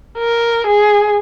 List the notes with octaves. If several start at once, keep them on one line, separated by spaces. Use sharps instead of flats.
A#4
G#4